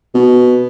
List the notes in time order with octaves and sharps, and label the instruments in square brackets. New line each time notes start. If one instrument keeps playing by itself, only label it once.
[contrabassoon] B2